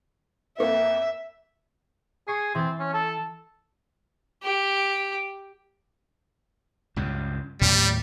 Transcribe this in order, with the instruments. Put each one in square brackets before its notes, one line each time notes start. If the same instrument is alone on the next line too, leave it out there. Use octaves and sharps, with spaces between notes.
[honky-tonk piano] F2 A#3 B3 [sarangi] E5
[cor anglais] G#4 [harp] C#6 C7
[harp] E3 A6 [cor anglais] C4
[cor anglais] C#4
A4
[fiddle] G4
[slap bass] C#2 G2 C#3
[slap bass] D#2 A2 A3 [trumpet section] G3